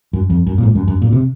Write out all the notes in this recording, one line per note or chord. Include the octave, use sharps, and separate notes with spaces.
F#2
F2
F#2
A#2
G#2
F#2
F#2
A#2
C3